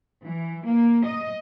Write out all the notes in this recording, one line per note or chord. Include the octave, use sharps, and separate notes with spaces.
E3
A#3
D#5